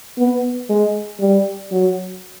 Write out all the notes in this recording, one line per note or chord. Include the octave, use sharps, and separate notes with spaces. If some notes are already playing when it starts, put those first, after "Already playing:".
B3
G#3
G3
F#3